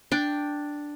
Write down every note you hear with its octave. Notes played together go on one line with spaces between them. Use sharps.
D4 G5